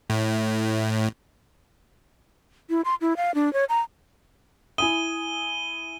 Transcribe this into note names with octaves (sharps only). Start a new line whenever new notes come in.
A2
E4
C6
E4
F5
D4
C#5
A#5
E4 G#5 D#6 D#7 G7